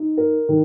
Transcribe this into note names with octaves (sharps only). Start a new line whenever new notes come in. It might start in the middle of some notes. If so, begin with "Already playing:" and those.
Already playing: D#4
A#4
D#3